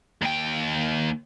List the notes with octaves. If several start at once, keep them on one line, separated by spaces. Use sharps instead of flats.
D#2 G5